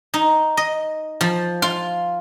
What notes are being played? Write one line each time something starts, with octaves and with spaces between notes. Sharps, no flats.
D#4
D#5
F3
F4